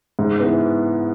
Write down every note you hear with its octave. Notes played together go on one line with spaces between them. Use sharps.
G#2
E3 B3